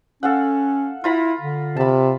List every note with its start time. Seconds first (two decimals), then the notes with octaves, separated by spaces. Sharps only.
0.23 C#4 A4 F5 F#5
1.04 E4 F4 A#5 B5
1.40 D3
1.77 C3 A5 B5